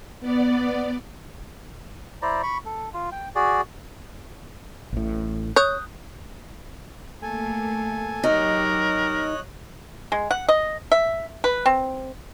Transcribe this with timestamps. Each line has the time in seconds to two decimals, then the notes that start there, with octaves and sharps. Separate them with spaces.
0.20 B3 D5
2.22 E4 C5 D5 A#5
2.43 B5 C#6
2.66 A4
2.94 F4
3.12 G5
3.35 F#4 G#4 D5
4.93 A1 A2
5.56 C#5 D#6 F#6 G6
7.22 A3 A#3 A4 G#5
8.23 F#3 D#4 G4 A#4 C#5 D#5 F#6
10.12 G#3
10.31 F#5
10.49 D#5
10.92 E5
11.44 B4
11.66 C4